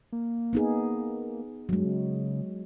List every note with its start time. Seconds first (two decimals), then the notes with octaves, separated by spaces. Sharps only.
0.13 A#3
0.53 B3 D#4 G#4
1.69 G2 F#3 G#3
1.86 C#3